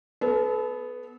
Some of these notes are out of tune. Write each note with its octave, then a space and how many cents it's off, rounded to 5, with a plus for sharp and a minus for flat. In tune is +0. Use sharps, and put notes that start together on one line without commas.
B3 +10 A4 -35